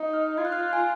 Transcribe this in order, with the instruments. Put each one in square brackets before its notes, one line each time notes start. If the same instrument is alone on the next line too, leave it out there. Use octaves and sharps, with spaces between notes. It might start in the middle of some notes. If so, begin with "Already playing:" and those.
Already playing: [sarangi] D#4
[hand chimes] F6
[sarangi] F4 [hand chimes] G#6
[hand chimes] F#6
F6
F#6
G#5